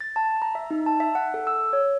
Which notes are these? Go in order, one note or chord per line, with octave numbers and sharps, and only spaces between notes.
A6
A5
A#5
E5
D#4
A5
E5
F#5
A4
E6
C#5